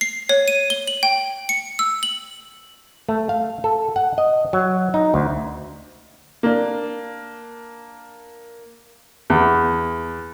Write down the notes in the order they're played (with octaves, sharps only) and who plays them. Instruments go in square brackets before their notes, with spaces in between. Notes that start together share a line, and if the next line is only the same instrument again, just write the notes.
[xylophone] C7
C#5
D#7
G7
F#7
G5
C#7
E6
F#7
[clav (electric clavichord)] A3
F5
A4
F#5
D#5
F#3
D#4
D2
[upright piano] A#3 D4
[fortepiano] E2